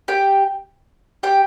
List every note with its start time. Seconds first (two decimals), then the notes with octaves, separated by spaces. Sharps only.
0.08 G4 G5
1.23 G4 G5